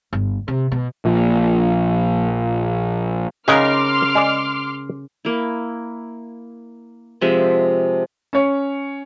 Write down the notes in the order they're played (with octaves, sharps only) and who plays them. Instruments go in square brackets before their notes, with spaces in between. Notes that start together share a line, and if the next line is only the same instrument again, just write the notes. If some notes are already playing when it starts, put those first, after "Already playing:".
[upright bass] G1
C3
B2
[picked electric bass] A#1 A#2
[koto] C#3 A#4 [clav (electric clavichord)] F#3 G#3 D#4 [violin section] C6 D6 F6
[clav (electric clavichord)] G#3 D5
[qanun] A#3 E4
C3 F3 G#3 E5
[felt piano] C#4 C#5